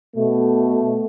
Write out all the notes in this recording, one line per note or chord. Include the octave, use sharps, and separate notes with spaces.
B2 A3